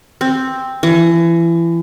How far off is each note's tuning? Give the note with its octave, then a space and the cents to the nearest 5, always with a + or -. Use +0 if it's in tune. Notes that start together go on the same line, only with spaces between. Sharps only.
C4 +5
E3 +30